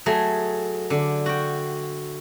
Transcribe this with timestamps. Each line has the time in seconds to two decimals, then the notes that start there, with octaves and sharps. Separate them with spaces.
0.06 F#3 A3 G#4
0.90 D3
1.26 F#4 G5